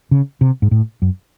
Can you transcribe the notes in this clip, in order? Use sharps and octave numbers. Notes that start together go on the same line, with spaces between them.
C#3
C3
G#2
A2
F#2